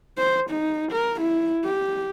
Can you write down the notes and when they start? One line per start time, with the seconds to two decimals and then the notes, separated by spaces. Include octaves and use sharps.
0.17 C5
0.50 D#4
0.92 A#4
1.21 E4
1.64 G4